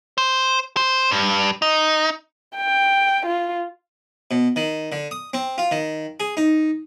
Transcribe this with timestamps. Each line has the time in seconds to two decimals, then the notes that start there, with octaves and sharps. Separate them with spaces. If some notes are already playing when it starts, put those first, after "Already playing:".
0.18 C5
0.77 C5
1.11 G2
1.62 D#4
2.57 G5
3.26 F4
4.31 B2
4.56 D#3
4.92 D3
5.11 D#6
5.33 C4
5.58 F4
5.71 D#3
6.20 G#4
6.37 D#4